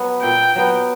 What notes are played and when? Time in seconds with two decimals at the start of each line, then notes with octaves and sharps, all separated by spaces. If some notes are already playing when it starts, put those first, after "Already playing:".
Already playing: F#3 B3
0.22 A#2 G5
0.56 F#3 B3